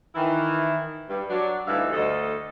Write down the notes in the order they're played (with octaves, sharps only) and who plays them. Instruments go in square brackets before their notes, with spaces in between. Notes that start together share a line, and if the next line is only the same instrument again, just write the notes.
[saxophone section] D#3 E3 E4
G2
F#3 D4
D2 G2 E3 D#4 E5 F5
D2 A4 D#5